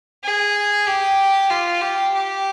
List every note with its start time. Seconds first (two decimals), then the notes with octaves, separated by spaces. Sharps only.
0.23 G#4
0.86 G4
1.50 F4
1.82 G4
2.14 G4